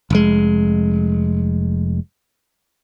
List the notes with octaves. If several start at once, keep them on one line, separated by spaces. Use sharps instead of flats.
F1 G#3